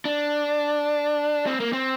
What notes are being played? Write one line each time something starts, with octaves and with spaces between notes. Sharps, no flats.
D4
C4
A#3
C4